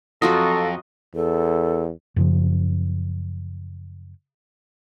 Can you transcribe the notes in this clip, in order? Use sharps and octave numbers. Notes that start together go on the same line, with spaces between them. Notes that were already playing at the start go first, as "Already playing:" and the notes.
F2 F#3 F4 F#4 A4 D#5
E2 A4
F#2 C#3 F3